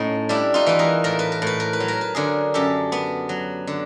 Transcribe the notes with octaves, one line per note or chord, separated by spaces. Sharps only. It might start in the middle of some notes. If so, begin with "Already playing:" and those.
Already playing: A2 C#4 D#4
G3 D4 E4
D#4 F4
E3 B4
G#4 A#4
A2 A#4
B4
A#4
A2 B4
A#4
B4
F#3
A#4
B4
D3 G#4 A#4
F#2 G4 A4
B3
F#3
D3